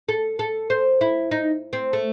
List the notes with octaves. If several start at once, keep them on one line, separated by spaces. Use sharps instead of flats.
A4
A4
C5
E4
D#4
C4
A3